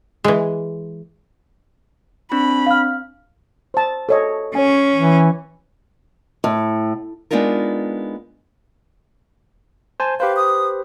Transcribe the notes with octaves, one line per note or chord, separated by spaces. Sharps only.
E3 G#3
C4 D4 B5
F5 F6
C5 A5
A4 C#5 D#5
C#4 C#5 G#5
E3
A2
G#3 B3 D4 D#4 F4 A#4
C5 G#5 A5
G4 B4 C5 F5
D#6